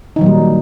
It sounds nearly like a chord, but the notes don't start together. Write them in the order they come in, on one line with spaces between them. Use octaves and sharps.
D#4 D#3 F#3 A#2 G3